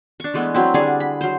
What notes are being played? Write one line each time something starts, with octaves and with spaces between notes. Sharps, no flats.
D4 C#6
E3 G#3 A3 B3
F#3 C4 E4
D3 G3 D4 G#4
B5
F#3 C5